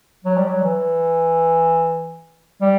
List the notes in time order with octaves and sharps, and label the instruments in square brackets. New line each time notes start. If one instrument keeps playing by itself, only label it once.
[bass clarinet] F#3
G3
F#3
E3
G3